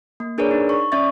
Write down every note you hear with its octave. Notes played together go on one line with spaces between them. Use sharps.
A#3
D4 G#4 A#4 B4 C#5 D5
D#4
C#6
C#4 D5 E5 C#6 A6